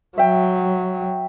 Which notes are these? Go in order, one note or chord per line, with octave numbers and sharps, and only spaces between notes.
F#3 E5 G5